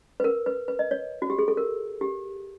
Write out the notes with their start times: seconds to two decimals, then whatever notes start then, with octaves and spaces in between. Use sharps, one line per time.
0.20 B4
0.24 A#4
0.46 B4
0.68 B4
0.79 D#5
0.91 C#5
1.22 F#4
1.30 G4
1.39 G#4
1.48 A4
1.57 A#4
2.01 G4